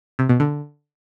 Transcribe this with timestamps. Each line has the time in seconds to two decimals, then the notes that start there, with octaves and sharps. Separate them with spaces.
0.19 C3
0.29 B2
0.40 D3